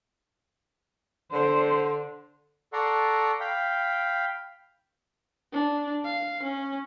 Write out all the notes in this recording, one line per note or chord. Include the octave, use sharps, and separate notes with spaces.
D3 C5
A4 D5 F#5 A#5 C6 C#6
F5 G5 B5
D4
F5
C#4